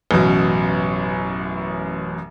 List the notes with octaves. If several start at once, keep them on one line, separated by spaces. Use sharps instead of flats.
A1 F#2 B2